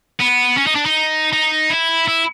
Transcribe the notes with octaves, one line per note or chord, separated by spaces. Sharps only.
B3
C#4
D#4
D4
D#4
D#4
E4
E4